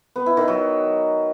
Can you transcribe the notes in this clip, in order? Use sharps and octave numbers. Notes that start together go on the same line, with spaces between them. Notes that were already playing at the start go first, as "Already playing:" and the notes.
B3
E4
D#3
F#3